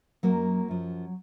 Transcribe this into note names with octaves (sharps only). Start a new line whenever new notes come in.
F#2 F3 F#3 A#3
F#2 F3